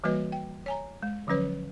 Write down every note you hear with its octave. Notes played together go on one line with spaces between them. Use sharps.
E3 G3 A#3 F#4 B4 D#5
G5
C#5 G#5 A#5
G#3
D3 F3 F#3 C#4 B4 C#5